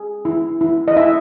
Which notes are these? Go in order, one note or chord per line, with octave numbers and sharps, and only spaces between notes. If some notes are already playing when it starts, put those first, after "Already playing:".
Already playing: G#4
E4
E4
D#5
E4 E5